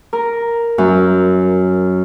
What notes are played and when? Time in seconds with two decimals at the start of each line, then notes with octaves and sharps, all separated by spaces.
0.13 A#4
0.78 F#2